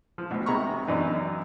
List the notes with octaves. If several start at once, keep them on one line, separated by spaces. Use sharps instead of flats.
F3
D2 B2
C3 G#3 A#5 B5 C#6
F#2 B2 E3 D4 D#4